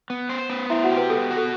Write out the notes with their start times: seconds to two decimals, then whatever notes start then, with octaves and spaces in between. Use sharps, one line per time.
0.10 B3
0.30 C5
0.50 B3
0.70 E4 C5 E5
0.84 F#4 F#5
0.90 G4
0.97 B4
1.10 B3 A4
1.31 F#4
1.37 A4